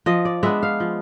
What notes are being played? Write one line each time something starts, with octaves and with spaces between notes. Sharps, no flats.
F3 D#5
D5
G#3 B3 D4 E5
F5
F3